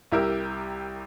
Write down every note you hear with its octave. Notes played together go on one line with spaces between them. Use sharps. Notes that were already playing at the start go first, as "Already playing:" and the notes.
C2 E4 G4 A#4 E6